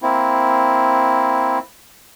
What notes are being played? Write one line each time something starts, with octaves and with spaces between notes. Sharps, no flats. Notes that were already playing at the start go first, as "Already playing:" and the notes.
A#3 C4 E4